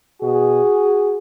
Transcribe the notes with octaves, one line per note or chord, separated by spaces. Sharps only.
B2 F#4 G#4